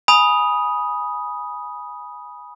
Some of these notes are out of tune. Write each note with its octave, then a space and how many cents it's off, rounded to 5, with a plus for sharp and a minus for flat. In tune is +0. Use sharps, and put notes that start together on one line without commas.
G#5 +0 B5 -20 D#6 +0